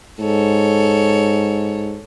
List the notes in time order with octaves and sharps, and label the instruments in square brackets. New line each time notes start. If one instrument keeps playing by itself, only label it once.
[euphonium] G#2 [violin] A4 C#5